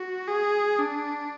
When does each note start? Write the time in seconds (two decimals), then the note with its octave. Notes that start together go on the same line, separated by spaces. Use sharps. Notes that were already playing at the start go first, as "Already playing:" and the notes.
Already playing: F#4
0.27 G#4
0.79 D4